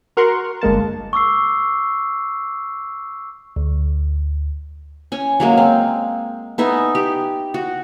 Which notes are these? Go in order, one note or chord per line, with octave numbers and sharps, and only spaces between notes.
F#4 A#4 F#5 C6 C#6
G1 G#3 A#3 A5
C#6 D6 E6 C7
D2
C#4 G#5
F#3 G#3 A#3
C4
B3 D#4 E5 G#5
G4
F#4